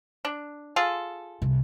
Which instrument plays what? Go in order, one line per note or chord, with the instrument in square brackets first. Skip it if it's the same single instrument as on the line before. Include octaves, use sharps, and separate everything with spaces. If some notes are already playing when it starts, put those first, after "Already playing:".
[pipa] D4
F4 G#4 A4
[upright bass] C2